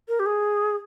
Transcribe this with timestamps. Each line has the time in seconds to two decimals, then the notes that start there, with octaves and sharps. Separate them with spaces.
0.09 A#4
0.20 G4
0.26 G#4